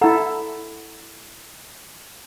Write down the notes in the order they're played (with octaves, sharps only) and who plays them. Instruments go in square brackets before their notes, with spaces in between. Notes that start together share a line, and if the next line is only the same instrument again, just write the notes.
[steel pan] E4 A4 [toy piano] F#5 A#5